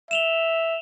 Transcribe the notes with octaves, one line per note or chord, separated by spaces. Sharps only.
E5 E7 F7 G7